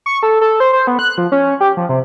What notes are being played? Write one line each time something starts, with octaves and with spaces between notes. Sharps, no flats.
C#6
A4
A4
C5
C5
B3
F#6
F3
C#4
G4
F3
C3